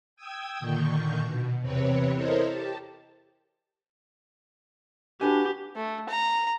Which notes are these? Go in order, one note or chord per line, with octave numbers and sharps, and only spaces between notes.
G5 D#6 E6 G#6
A#2 D3 D#3 C#6 G6
B2
E2 C3 C4 B4 C#5
E4 A4 A#4 C5 C#5 D#5
G4 A5
D4 F#4 G4 B4 G#5
A3
A#5